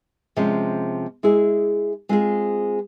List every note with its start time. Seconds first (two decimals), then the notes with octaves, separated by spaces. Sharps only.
0.36 C3 F3 G#3 C#4
1.23 G#3 E4 G#4
2.09 G#3 C4 F4 G#4